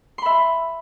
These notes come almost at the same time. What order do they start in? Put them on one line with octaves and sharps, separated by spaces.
C6 B5 E5